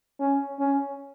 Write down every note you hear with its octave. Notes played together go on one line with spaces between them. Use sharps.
C#4
C#4